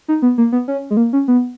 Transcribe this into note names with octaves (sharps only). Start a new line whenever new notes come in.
D#4
B3
A#3
B3
C#4
G#3
A#3
C#4
B3